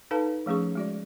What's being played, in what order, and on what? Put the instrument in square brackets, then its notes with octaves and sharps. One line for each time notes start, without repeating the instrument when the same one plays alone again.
[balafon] D#4 A4 B4 F5 A5 A#5
F3 A3 C#4 G#4 C#6
G#3 F#4 D5